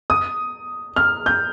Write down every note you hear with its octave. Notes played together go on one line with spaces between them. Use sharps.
D#6
F6
G6